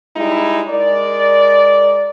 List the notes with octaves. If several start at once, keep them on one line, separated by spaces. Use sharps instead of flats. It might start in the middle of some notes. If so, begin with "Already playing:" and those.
G3 G#3 D#4 E4
G#3 A#4 D5